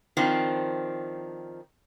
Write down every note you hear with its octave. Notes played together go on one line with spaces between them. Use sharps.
D#3 F3 C4 D4